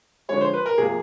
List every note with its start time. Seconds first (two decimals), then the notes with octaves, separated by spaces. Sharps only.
0.29 D3 F3 G#3 C#5
0.41 C5
0.54 B4
0.66 A#4
0.78 C3 F3 A#3 G#4